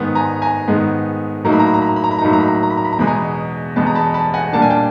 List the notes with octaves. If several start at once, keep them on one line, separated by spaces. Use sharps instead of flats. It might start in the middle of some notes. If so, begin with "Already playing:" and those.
Already playing: G#2 D#3 G#3 B3
G#5 A#5
G#5 A#5
G#2 D#3 G#3 B3
A2 F#3 A#3 D#4 A#5
B5
A#5
B5
A#5
B5
A#5
B5
A#5
B5
A#5
A2 F#3 A#3 D#4 B5
A#5
B5
A#5
B5
A#5
B5
A#5
B5
A#5
E2 B2 G#3 B5
G#5 A#5
E2 B2 G#3 A5 B5
A#5
A5 B5
A5 B5
F#5 G#5
A#2 G3 A#3 D4 A5
G#5
G5 A5